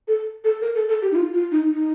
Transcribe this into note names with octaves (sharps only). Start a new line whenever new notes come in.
A4
A4
A#4
A4
A4
G4
D#4
F4
F4
D#4
D#4